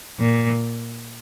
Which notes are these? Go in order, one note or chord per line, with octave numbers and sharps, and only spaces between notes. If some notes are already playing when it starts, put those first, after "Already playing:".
A#2